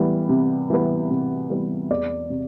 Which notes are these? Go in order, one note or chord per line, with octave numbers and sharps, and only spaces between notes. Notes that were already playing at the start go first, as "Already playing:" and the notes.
Already playing: E3 G3 B3
C3
E3 G3 B3
C3
E3 G3 B3
E2 D5
C3